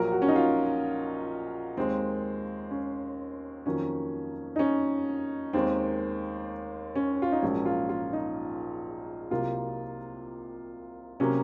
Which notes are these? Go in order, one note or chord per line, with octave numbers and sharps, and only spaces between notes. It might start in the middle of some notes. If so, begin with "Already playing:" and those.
Already playing: A#1 A#2 F#3 A#4
F#4
C#4
D#4
F4
D#2 D#3 G#3 C4
C#4
F2 D#3 F#3 A#3 C#4
D#4
C#4
D#2 D#3 G#3 C4
C#4
F4
D#4
A#1 G#2 F#3 A#3 C#4
F4
F4
D#4
C2 C3 F#3 A#3 F4
C3 F#3 A#3 C#4